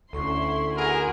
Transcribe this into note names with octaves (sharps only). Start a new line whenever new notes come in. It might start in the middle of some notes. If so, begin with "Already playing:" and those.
D2 C#4 E4 A4 C6 C#6
E4 F#4 G#4 A#4 G#5 C6